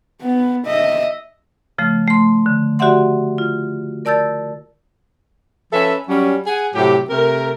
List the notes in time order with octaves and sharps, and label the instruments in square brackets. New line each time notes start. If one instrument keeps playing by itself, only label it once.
[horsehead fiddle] B3
D#5 E5
[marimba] C#3 F3 A3
A3 C6
D3
F#4 G4 D5 E5 F#5 C6
F4
A#4 D5 A5 E6 G6 A6
[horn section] F3 C#4 A4 B4 E5
F#3 G3 C#4
G#4 F#5 G#5
A2 C3 F#3 G4
C3 A3 A#4